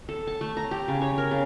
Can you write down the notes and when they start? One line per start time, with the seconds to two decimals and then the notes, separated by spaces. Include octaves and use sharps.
0.09 A4
0.27 A5
0.41 A3
0.57 A#5
0.71 G4
0.88 C#3
1.02 C#5
1.18 A#4
1.31 C#3